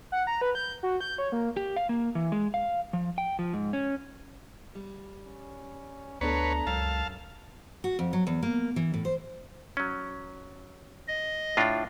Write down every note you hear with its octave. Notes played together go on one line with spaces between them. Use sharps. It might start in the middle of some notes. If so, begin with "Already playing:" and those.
F#5
A#5
B4
G6
F#4
G6
C#5
A#3
G4
F5
A#3
E3
G#3
F5
F3
G5
F3
G#2
C#4
G3
C#4
D2 B3 D4 A4 B4 C#5 A#5
C#2 F#2 F5 A5
F#4
F2
F#3
E2
A#3
E3
A2
C5
F#3 C#4
D#5
A2 D4 F4